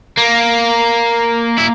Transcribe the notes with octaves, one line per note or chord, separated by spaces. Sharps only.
A#3
E4